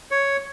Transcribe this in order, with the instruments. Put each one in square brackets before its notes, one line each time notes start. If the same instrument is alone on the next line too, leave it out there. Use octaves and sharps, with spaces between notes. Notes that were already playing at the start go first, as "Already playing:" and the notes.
[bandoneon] C#5